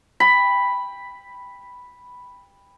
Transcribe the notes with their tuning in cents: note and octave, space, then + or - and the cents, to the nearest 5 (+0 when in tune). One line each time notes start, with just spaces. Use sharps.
G5 +20 B5 +0